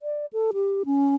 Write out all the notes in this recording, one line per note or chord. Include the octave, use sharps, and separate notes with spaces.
D5
A4
G4
C#4